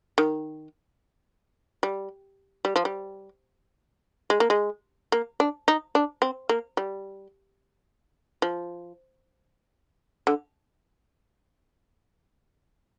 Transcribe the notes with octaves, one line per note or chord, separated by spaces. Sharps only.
D#3
G3
G3
F3
G3
G#3
A#3
G#3
A#3
D4
D#4
D4
C4
A#3
G3
F3
D3